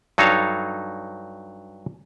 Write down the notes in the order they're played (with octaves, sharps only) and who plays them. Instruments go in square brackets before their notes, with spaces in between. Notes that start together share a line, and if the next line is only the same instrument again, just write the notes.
[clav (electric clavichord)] G2 F#3 D#4 A4 C#5 F5